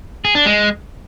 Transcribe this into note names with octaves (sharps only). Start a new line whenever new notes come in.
G#4
D4
G#3